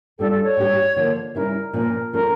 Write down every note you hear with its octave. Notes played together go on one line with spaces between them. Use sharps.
A2 G3 D4 F4 A4
A4
C#5
A2 G3 D4 G4
D3 F3 A#3
C#3 G3 C#4 E4 A#4
A#2 F3 C#4 A#4
F3 A3 C#4 A#4